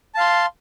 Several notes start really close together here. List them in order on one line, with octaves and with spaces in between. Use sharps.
A5 F5 C6